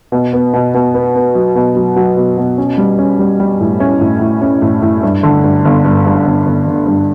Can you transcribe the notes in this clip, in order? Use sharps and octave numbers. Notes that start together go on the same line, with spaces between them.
B2
B3
B2
B2
B3
B3
F#3
B2
F#3
F#3
B2
B2
C#4
G3
C#4
G3
G3
A2
C#4
A2
A2
C#4
A2
A2
G2
D3
G2
G1
G2
G2
G1
G1
G1
G2